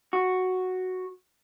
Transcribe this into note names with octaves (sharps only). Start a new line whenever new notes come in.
F#4